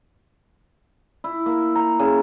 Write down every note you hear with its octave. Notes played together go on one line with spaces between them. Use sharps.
E4
A#3
A#5
C#3